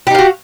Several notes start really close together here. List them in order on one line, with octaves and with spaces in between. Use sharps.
G4 D#4 F5 F#4